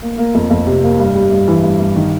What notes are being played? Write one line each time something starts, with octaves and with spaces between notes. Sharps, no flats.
A#3
A#3
F2
F2
C3
A#3
G2
G3
G2
E3
G2
G2
D#3